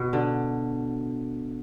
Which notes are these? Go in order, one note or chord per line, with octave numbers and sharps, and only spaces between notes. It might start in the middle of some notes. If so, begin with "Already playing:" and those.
Already playing: B2
D3